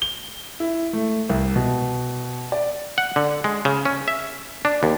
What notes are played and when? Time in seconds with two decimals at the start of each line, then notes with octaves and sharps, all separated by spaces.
0.02 G7
0.60 E4
0.93 A3
1.29 C2
1.56 B2
2.52 D5
2.98 F#5
3.16 D3
3.44 G#3
3.65 C#3
3.85 C#4
4.08 E5
4.65 D4
4.83 D#2